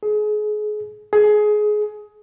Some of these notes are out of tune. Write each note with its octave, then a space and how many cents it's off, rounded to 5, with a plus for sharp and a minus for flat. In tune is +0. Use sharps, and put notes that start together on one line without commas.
G#4 +30
G#4 +20